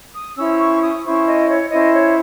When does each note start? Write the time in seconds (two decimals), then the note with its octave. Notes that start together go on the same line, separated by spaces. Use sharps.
0.14 D#6
0.37 C#4 E4 C5 E6
0.59 C#6
0.82 D#6
1.04 C#4 E4 C5 C#6
1.26 D#5
1.49 C#5
1.71 C#4 E4 C5 D#5
1.94 C#5